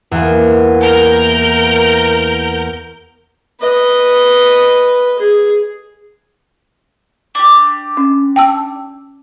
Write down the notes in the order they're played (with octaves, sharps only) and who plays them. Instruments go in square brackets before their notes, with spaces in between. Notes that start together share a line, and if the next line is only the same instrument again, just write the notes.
[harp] E2 A#3
[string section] A#4 G6
[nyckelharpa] B4 D#5
G#4
[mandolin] D4 G4
[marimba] C#4
G5 A5 E6